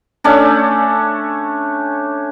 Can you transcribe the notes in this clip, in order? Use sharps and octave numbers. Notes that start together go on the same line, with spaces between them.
A3 C#4 D4